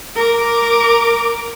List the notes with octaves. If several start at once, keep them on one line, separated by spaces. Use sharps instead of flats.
A#4 D6